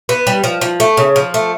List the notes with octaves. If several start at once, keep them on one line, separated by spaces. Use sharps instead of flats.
B3
G3
F3
F3
A3
C#3
F3
A3